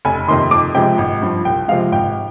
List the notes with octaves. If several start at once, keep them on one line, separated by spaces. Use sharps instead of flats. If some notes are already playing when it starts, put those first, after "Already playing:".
F1 G#5
F2 C3 D#3 C6
F2 D6
C3 F3 G#3 G5
G#1
G2 F3
C2 G5
C3 F3 G#3 F5
G#1 G5